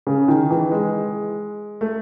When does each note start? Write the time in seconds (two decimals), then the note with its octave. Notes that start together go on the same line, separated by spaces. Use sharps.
0.07 C#3
0.28 D#3
0.51 E3
0.72 G#3
1.81 A3